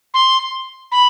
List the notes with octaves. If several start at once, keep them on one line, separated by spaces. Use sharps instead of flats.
C6
B5